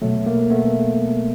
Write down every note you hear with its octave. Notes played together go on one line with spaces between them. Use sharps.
B2 F#3 A3
A#3
A3 B3